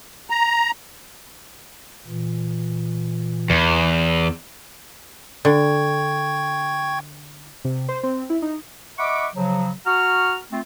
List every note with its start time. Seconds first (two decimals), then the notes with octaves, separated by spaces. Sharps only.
0.30 A#5
2.07 A#2 E3
3.50 E2
5.45 D3 G5 C#6 G#6
7.65 C3
7.89 C5
8.03 C4
8.30 E4
8.42 D#4
8.98 D#5 E5 F#5 B5 C#6 D6
9.35 C#3 F3 F#3
9.86 F#4 F#5 A#5 C#6 F6
10.52 A3 C4 F4